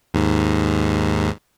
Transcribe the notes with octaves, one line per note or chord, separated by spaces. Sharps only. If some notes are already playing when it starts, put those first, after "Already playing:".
D#2 G#2